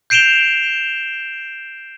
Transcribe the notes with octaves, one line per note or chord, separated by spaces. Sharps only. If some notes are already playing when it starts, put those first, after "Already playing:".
G6 C7 D7 E7 F7 G7